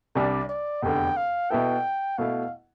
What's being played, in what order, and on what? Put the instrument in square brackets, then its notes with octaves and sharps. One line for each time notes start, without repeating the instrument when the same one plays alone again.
[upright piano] C2 C3 G3 D4 [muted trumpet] D5
[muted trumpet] D5
[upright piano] F1 E2 D3 [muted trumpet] G5
[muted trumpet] F5
[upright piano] B2 B3 E4 A4 [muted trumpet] G5
[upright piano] B2 A3 E4 [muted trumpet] F5